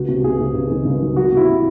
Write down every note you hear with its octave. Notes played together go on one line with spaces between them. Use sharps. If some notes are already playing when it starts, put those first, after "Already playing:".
Already playing: C#2 F#4
C3
C#2 G#4
C3
C#2
D#3
C#2
F#3
F#3 F#4
C3 E4